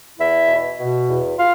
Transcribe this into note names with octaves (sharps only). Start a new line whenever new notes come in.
E2 E4 E5
B2
B2
E2
F4 F5